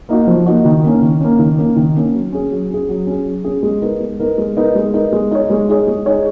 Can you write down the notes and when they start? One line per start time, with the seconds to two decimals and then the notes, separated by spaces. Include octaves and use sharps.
0.09 A#3 D#4 F#4
0.27 F3
0.46 A#3 D#4 F#4
0.65 D#3
0.84 A#3 C#4
1.02 D#3
1.20 A#3 C#4
1.39 D#3
1.58 A#3 C#4
1.76 D#3
1.95 A#3 C#4
2.14 F#3
2.33 C#4 G#4
2.51 F#3
2.70 C#4 G#4
2.89 F#3
3.07 C#4 G#4
3.26 F#3
3.45 C#4 G#4
3.63 G#3
3.82 B3 D#4 A#4
4.01 G#3
4.20 B3 D#4 A#4
4.38 G#3
4.57 B3 D#4 A#4
4.75 G#3
4.94 B3 D#4 A#4
5.12 G#3
5.31 D#4 G#4 C#5
5.50 G#3
5.69 D#4 G#4 C#5
5.87 G#3
6.06 D#4 G#4 C#5